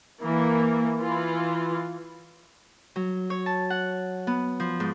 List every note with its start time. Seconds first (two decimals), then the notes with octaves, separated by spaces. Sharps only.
0.23 E3 A#3
0.97 E3 F4
2.96 F#3
3.30 C#5
3.46 A5
3.70 F#5
4.27 B3
4.60 F3
4.80 G#2